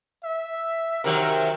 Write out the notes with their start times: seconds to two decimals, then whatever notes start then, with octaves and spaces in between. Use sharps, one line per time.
0.24 E5
1.04 C3 D#3 F#3 A#4